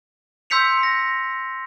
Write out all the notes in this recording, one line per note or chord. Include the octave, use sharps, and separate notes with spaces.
C6 E6 G6 B6 C#7 F7
A#6